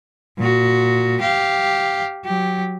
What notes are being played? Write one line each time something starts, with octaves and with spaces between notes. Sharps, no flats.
A#2 F#4
G4 F5
F#3 G4